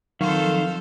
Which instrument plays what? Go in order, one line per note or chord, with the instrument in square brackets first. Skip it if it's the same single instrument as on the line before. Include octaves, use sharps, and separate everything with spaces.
[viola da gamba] F2 A4 C5 [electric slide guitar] D#3 [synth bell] F#3 [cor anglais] F5